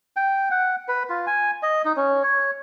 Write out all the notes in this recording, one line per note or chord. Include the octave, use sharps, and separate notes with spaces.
G5
F#5
B4
F4
G#5
D#5
D#4
C#4
C#5